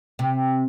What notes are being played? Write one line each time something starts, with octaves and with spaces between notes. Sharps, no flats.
C3